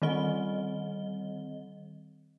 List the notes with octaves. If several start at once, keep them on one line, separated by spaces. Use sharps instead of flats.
D#3 G3 C4 D#5 G7